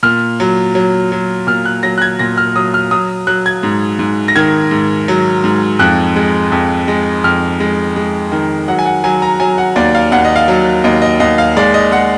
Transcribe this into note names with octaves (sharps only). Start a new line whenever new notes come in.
A#2 F6
F#3
F#3
F#3
A#2 F6
F#6
F#3 A#6
F#6
G#6
A#2 A#6
F6
F#3 D#6
F6
F#3 D#6
F#3 F#6
G#6
G#2
G#2
A#6
D#3 G#6
G#2
F#3
G#2
F2 F#6
G#3
F2
G#3
F2 F6
G#3
G#3
D#3
F#3 F#5
G#5
F#5
F#3 G#5
A#5
F#3 G#5
F#5
D#2 D5
F5
D#2 F#5
D#5
F5
F#3
D#2 D#5
D#5
D#2 D#5
F5
G#3 D5
D#5
G#3 F#5